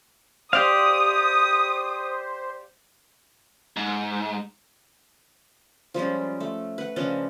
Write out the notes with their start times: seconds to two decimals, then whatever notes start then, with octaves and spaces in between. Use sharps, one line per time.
0.53 G4 C5 D5 F5 D#6
3.76 G#2
5.94 F3 G3 G#3 C#4
6.40 A3
6.78 B4 F#5
6.96 C#3 F3 C#4 D4